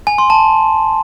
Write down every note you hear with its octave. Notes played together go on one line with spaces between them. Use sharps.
G#5
C6
A5